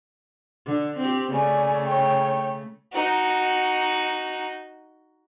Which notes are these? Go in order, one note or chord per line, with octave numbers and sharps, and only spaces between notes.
D3
C4 G4
C#3 A3 D5 G#5
C#5 G5
D#4 F#4